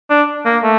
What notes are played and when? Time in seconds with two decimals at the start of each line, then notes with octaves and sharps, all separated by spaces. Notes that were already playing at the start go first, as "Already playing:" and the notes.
0.10 D4
0.45 A#3
0.63 A3